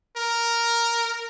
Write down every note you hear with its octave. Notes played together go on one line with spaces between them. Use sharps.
A#4